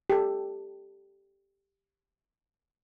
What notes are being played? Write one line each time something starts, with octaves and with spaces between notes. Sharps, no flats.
G4 A4